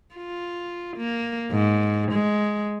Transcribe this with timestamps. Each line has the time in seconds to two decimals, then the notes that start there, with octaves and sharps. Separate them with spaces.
0.15 F4
0.98 A#3
1.52 G#2
2.12 G#3